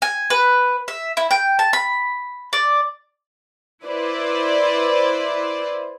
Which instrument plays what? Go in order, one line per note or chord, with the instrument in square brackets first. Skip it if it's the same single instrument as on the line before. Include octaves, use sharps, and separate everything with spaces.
[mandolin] G#5
B4
E5
E4
G5
A5
B5
D5
[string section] E4 B4 C5 D5